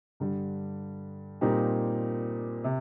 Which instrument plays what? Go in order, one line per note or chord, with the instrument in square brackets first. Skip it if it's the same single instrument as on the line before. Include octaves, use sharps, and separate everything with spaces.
[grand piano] G2 D3 G3
A#2 G3 C4 D#4 G4
C3